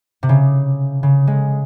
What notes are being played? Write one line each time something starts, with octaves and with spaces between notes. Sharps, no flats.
C3
C#3
C#3
G#3